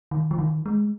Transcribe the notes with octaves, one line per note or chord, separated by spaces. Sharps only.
D#3
F3
D#3
G#3